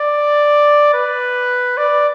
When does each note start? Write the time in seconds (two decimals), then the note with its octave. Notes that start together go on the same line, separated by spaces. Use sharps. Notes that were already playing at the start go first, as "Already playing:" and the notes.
Already playing: D5
0.94 B4
1.78 D5